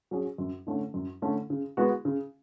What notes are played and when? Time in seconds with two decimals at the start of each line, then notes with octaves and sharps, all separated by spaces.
0.11 F#3 C#4 G#4
0.38 F#2
0.67 D3 A3 C#4
0.94 F#2
1.22 D3 A3 C#4
1.50 C#3
1.77 G#3 B3 F#4
2.05 C#3